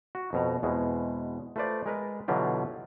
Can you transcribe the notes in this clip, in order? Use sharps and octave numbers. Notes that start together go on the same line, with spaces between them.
F#4
F2 B2 A#5
E2 B2 G#3 C4
A3 F4 B4 C5 D5
G#3 A#4 B4
B2 D3 E3 F#3 F4 G4